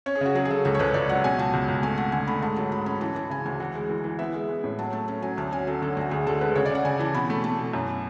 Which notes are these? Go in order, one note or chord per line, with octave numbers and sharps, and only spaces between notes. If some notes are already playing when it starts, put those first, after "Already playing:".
C#4 C#5
G#4
C#3 F#4
F#3 G#4
G#4
C#3 A4
C#2 A4
C#5
C#2 B4
C#2 D5
F#3 F#5
B2 G#5
C#2 A5
C#2
C#2
A3 G#5
A3 F#5
D3 G#5
A3 B5
G#2 A5
F#3 A5
F#3 B5
C#4 B5
E3 A5
E3 A5
C#3 G#5
D2 G#5
E3 F#5
G#3
E3
E3
B3 E5
G#3
G#3
A2
F#3 A5
A3 A5
C#4 A5
F#3 G#5
D2 A5
C#4 G#5
F#3 A4
D3 A4
D2 F#4
D2 G#4
D3 A4
G#3 B4
C#3 C#5
D5
C#3 F#5
C#3 G#5
E3 A5
B2 B5
A3
A3 A5
B2
F#2